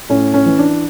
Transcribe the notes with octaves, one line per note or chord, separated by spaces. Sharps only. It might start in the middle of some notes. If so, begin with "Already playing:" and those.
A2 C#4
C#4
E3
D4